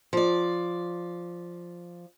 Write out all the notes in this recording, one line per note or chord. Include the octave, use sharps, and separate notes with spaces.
F3 D5